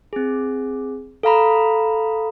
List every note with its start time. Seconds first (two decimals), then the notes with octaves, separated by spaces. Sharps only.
0.13 C4 G#4
1.23 A4 F5 A#5 B5